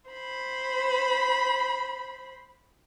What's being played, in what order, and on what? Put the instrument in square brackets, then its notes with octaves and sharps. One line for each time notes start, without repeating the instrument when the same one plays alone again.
[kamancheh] C5 B5